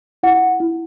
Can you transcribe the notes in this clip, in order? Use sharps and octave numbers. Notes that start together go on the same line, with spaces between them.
E4 F#5
E4